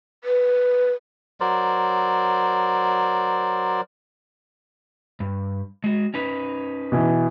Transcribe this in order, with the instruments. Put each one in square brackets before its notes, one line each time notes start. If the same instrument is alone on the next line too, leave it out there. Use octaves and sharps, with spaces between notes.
[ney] B4
[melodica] F#3 A#4 C5 D5
[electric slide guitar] G2
G#3 F#4
C#4 D#4 B4
[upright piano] B2 E3